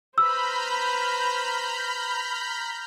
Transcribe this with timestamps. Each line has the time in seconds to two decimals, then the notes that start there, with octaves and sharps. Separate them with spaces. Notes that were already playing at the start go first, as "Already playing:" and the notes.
0.18 B4 C5 A#5 B5 E6 F6 G6